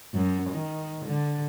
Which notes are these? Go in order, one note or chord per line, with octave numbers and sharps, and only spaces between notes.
F#2
D#3
D3